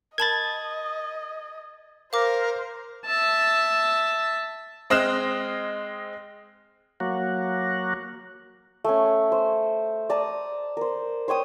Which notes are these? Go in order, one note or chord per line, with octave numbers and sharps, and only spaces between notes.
A#4 D#5 A5 B5 G#6 A6
A#4 C5 F5 D6
E5 A5
G#3 C4 D#5 F6 F#6 E7
F#3 A#3 F#4
A3 C#4
C5
D5 A5 A#5 D#6
A#4 C5
C5 C#5 G5 D#6